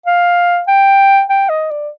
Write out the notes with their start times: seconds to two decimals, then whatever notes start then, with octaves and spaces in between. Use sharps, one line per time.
0.06 F5
0.68 G5
1.30 G5
1.49 D#5
1.71 D5